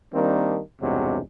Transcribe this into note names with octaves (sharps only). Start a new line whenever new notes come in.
D#3 G3 A#3 C4 D4
B1 E2 G2 C3 F#3 G#3